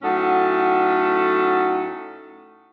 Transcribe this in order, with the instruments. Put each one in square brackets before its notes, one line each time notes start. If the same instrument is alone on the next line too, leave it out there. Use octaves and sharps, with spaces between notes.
[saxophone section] A2 F#3 C#4 D#4 A4 F#5